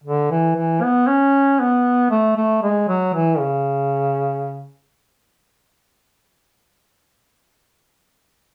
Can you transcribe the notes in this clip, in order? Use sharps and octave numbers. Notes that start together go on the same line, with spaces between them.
D3
E3
E3
B3
C#4
B3
A3
A3
G#3
F#3
E3
C#3